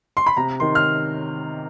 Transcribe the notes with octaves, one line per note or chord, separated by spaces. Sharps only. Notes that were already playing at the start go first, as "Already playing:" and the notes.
C6
B5
C3 A#5
D#3 C6
F6